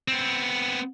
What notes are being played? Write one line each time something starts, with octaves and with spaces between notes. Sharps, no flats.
B3 C4